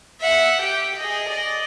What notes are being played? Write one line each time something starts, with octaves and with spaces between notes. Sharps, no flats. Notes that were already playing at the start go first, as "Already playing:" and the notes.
E5 F#5
G4 G5
G#4 D#5
D5 D#5